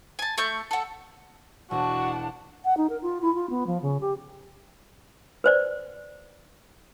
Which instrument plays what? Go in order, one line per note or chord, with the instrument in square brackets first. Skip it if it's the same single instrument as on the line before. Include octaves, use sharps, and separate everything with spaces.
[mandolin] G#5 A5
A3 C#6 G6
A4 F#5
[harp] E1 [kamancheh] D4 F#5 [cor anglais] F#4 [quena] A5
[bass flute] F#5
D#4
A#4
F4
E4
F4
B3
F3
C#3
G4
[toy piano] B4 C5 D5